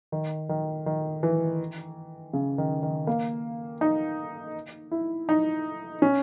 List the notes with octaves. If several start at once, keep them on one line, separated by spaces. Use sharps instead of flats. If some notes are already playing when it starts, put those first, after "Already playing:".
D#3
D#3
D#3
E3
C#3
D#3
D#3
A#3
D#4
E4
D#4
C#4